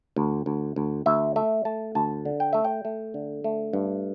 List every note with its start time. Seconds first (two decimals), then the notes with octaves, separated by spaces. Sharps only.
0.16 D2
0.46 D2
0.76 D2
1.06 D2 E5
1.36 A3 E5
1.65 A3 A5
1.95 D2 A5
2.25 D3
2.40 G5
2.53 A3 E5
2.65 G5
2.85 A3
3.14 D3
3.44 A3
3.73 G2